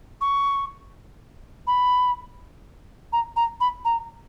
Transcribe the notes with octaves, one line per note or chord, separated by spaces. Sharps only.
C#6
B5
A#5
A#5
B5
A#5